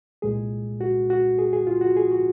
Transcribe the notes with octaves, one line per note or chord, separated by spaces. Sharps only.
C2 A#2 G#3 G#4
F#4
F#4
G#4
G#4
F4
F#4
G#4
F#4